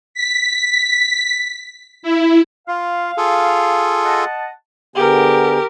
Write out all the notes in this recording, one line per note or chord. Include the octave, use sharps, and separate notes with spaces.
B6
E4
F4 F5
F4 G#4 A4
D#5 F#5 A5
D3 B3 G4 G#4 A#4